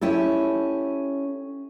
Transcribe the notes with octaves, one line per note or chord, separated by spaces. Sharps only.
C#4 E4 G4 A4